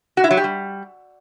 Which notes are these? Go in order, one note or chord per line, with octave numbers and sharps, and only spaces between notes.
F#4
E4
F#3
G4
G3